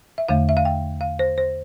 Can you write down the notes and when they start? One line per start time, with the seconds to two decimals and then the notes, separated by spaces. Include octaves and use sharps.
0.18 E5
0.29 E2 D3 A3 F5
0.49 E5
0.57 F5
0.65 G5
1.01 F5
1.19 C5
1.38 C5